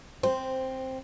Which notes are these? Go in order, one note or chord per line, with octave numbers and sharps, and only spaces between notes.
C4 C5